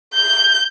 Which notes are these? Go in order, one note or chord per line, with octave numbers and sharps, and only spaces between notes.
G6